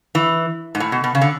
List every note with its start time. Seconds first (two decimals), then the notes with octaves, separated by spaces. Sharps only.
0.15 E3
0.75 G#2
0.80 A2
0.92 B2
1.04 B2
1.15 C#3
1.21 D3